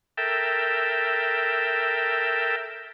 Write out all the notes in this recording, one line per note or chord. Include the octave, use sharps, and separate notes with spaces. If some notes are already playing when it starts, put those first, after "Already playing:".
A4 A#4 E5 G5